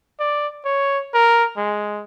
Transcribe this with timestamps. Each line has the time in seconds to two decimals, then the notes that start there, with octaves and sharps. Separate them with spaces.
0.20 D5
0.65 C#5
1.14 A#4
1.57 G#3